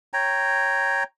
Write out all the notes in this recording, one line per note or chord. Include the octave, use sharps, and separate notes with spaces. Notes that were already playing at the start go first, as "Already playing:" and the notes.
C#5 G5 A#5